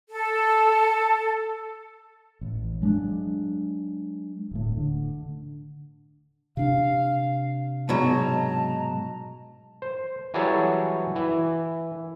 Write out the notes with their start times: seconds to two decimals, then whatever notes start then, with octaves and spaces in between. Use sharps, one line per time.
0.10 A4
2.41 A1
2.82 F#3 G#3 A#3 D4
4.51 D1 A2
4.77 D3
6.57 C3 D4 F5
7.89 G#2 B2 F#3 D#5 A5 A#5
9.82 C5
10.34 E3 F#3 G3 G#4 A4 C#5
11.16 E3